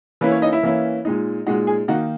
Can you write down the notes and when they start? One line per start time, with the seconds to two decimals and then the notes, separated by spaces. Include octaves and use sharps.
0.21 E3 A#3 C#4 E4 B4
0.32 C#5
0.42 D#4 D#5
0.53 E4 E5
0.63 E3 A#3 C#4 E4
1.05 A#2 G#3 D#4
1.46 A#2 G#3 D#4 F#4 F#5
1.67 G#4 G#5
1.88 D#3 A#3 D#4 F#4 F#5